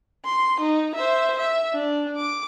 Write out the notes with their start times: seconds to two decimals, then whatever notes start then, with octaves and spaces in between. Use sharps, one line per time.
0.25 C6
0.60 D#4
0.94 C5 E5
1.37 E5
1.73 D4
2.17 D6